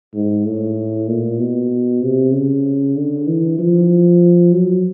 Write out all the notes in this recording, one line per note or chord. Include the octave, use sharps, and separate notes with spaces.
G#2
A2
A#2
B2
C3
C#3
D3
E3
F3
F#3